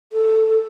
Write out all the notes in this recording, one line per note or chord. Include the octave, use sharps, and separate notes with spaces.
A4